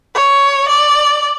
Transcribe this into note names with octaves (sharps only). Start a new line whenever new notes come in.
C#5
D5